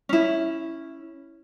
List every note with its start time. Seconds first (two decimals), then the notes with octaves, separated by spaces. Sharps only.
0.09 C#4 E4